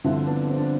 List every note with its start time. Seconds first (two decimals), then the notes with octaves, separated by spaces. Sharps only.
0.04 G1 G2 D3 F3 C4 E4
0.26 B3 D4
0.50 C4
0.58 D4